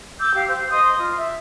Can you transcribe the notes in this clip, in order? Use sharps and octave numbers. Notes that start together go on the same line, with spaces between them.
D6 E6 G6
G4 F5
C5
C5 D#5 C6 D#6
F4
E5